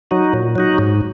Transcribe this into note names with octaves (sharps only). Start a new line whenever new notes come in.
F#3 D#4 F#4
A#2
F#3 D#4 F#4
G#2